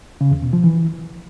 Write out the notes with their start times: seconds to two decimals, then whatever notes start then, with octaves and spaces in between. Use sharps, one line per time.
0.21 C#3
0.32 E2
0.42 B2
0.53 F3
0.64 E3